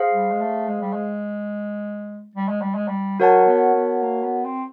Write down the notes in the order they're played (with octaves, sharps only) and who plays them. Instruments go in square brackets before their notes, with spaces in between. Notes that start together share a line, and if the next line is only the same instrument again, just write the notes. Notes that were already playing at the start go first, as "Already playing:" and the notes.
Already playing: [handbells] G#4 C5 F5
[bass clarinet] G3
G#3
A3
G#3
G3
G#3
G3
G#3
G3
G#3
G3
[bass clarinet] F#3 [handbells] F#4 A#4 C#5 F#5 A5
[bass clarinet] B3
B3
A#3
B3
C4